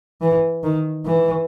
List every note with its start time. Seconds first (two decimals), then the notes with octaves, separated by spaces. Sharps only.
0.22 E3
0.63 D#3
1.06 E3